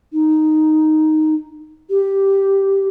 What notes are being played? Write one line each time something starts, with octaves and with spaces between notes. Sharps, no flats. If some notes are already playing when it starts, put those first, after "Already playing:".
D#4
G4